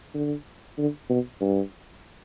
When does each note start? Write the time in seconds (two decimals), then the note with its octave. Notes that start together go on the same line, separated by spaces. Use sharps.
0.15 D3
0.78 D3
1.09 B2
1.41 G2